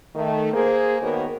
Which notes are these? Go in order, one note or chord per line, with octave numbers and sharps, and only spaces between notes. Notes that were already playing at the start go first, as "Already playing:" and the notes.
D#3 A3
A#3 G#4 C5
D#3 A#3 B3 F#4 A#4 C#5